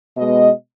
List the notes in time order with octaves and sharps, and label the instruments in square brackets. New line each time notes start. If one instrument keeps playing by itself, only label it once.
[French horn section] B2 G#3 B3 D#5